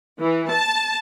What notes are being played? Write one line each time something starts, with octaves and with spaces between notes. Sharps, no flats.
E3
A5